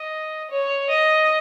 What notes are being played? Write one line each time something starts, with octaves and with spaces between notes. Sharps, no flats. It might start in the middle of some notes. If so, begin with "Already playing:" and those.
Already playing: D#5
C#5
D#5